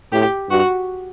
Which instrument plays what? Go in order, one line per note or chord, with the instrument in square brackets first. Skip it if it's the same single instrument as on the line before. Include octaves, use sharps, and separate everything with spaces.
[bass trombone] A2 [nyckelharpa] G4
[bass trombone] G2 [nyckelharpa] F#4